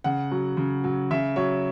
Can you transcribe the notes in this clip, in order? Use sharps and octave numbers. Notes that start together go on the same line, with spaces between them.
C#3 F#5
F#3
C#3
F#3
C#3 E5
F#3 C#5